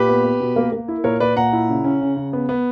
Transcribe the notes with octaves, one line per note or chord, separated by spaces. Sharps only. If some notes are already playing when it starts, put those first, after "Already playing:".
Already playing: A#2 G4 B4
B3
B3
B2
A#3
A#3
E4
A#2 A#4 C#5
A#2 B4 D5
A#2 F#5 A#5
E4
C#3
C#4
C#3
C#3
B3
B3